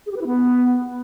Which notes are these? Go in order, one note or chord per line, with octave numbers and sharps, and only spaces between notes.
G#4
G4
B4
E4
B3